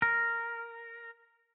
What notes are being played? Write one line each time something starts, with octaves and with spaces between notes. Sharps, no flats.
A#4